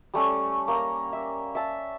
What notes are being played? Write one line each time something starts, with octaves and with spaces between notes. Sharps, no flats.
G3 A3 C#4
A#3 A#5
E5
E5 A5